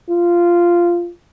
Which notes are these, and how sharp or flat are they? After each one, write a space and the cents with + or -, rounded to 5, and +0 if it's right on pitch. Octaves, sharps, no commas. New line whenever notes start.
F4 -10